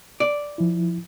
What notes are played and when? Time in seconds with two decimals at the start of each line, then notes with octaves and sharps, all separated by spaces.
0.20 D5
0.58 F3 E4